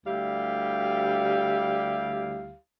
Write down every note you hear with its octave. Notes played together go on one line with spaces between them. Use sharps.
D2 G3 E4 G4 F5